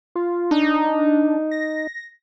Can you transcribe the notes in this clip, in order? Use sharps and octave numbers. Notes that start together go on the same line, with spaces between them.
F4
D4 D#4
A#6